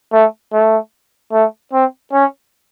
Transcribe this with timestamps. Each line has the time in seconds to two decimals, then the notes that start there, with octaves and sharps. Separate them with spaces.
0.13 A3
0.53 A3
1.32 A3
1.73 C4
2.13 C#4